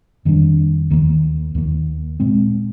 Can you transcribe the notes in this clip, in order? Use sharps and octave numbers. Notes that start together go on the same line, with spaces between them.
F2 D#3 G3 D4
D#2 D#3 A#3
D#2 D#3 A#3
A#2 G#3 C4